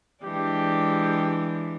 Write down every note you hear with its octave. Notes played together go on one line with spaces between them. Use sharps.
E3 G#3 D4 G4